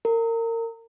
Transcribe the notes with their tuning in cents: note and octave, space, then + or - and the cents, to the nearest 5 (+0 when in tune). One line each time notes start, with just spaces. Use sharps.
A#4 -30